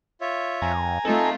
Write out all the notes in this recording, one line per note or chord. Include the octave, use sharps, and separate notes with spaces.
F4 C#5 E5
F2 G#5 A#5
A3 C4 D#4 F4 A4